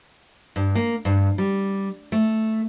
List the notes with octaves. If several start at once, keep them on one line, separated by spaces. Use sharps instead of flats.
G2
A#3
G2
G3
A3